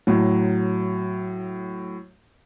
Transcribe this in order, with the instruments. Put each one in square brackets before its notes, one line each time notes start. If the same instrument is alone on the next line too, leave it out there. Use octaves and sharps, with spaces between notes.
[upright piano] A2 F#3